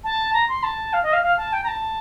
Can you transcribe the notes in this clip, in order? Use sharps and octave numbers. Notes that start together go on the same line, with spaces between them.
A5
A#5
C6
A5
F5
D#5
F5
F5
A5
G5
A#5
A5